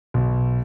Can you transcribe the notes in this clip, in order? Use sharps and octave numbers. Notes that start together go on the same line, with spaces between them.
B1